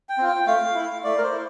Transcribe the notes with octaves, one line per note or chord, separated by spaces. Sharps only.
G5
C4 F4
G5
A3 F5
E4
A3 D5
A#4
C5
E4